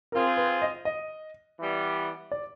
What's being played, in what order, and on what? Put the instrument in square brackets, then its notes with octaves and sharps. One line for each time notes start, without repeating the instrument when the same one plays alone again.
[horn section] C4 F4 G#4 [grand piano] A#4
[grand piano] B4
D#5
D#5
[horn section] E3 G3 B3
[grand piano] D5